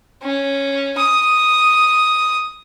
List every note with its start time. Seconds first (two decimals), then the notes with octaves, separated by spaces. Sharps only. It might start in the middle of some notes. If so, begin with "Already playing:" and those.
0.23 C#4
0.98 D#6